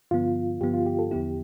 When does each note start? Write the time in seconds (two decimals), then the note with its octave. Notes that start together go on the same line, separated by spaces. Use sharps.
0.11 G2 D3 F3 B3 F4
0.61 G2 D3 F3 B3 G4
0.73 F4
0.86 G4
0.99 A4
1.10 E2 D3 F3 B3 E4 G4